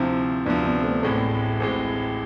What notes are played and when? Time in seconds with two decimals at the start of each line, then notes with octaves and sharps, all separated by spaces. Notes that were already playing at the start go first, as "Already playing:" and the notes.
Already playing: D2 C3 F3 C4 E4
0.46 D2 C3 F3 B3 D4
0.65 B3 D4
0.83 A3 C4
1.03 A1 A2 G#3 A3 C4
1.59 A1 A2 G#3 A3 C4